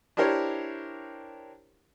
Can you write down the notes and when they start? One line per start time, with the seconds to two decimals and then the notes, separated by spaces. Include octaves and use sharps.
0.17 D4 E4 G4 A#4 C5 C#5